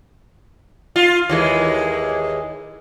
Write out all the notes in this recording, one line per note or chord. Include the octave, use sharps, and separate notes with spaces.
F4
D#2 E3 G#3